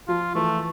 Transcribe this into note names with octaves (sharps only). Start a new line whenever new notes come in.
F3 F4
E3 A3